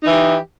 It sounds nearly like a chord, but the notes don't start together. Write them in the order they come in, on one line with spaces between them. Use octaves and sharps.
D#4 E3 G4